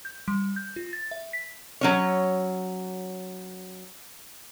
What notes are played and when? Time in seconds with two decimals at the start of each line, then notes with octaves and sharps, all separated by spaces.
0.05 G6
0.28 G3
0.56 G6
0.76 F4
0.93 A6
1.11 E5
1.33 B6
1.81 F#3 C#4 C#5